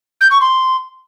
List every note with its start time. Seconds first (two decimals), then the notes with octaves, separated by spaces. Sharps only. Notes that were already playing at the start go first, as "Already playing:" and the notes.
0.20 G6
0.31 C#6
0.41 C6